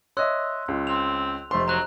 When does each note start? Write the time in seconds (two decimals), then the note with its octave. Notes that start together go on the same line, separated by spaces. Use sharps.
0.17 C#5 D#5 E5 C6 E6 F#6
0.68 C#2
0.87 C4 F7
1.51 F1 A3 C5 C6
1.68 F#3 A#5 F#6